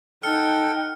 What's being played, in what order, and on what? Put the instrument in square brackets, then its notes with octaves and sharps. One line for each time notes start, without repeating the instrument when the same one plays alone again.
[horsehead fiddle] D#4 F#5 [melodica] A4 [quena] G5 [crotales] F6 C#7